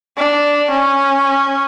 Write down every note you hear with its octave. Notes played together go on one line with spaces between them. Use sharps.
D4
C#4